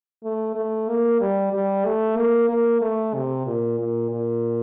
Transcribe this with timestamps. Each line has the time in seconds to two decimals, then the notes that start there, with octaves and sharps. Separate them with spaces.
0.24 A3
0.55 A3
0.89 A#3
1.20 G3
1.53 G3
1.85 A3
2.17 A#3
2.49 A#3
2.81 A3
3.15 C3
3.46 A#2
3.79 A#2
4.11 A#2